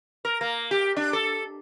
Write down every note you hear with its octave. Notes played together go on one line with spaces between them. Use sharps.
A#4
A#3
G4
D4
A4